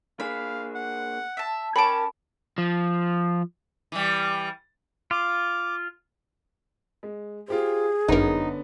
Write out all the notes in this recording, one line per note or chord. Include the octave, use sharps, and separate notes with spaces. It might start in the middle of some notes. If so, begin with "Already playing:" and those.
A#3 D4 G#4 F5 B5
F#5
E5 A5
C#4 A#4 C#5 G5 A5 B5 D6
F3
E3 G3
F4 D6
G#3
F4 G4 G#4 C5
G1 F#2 D3 B3 C#4 D#4 A#4